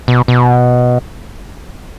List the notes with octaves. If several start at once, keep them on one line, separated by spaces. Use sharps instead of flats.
B2
B2